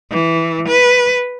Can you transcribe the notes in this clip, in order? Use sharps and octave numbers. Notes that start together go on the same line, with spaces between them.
E3
B4